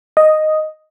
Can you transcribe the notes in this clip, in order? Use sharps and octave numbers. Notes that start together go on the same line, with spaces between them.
D#5